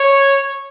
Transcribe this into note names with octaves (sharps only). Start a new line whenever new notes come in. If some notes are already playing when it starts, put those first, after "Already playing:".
Already playing: C#5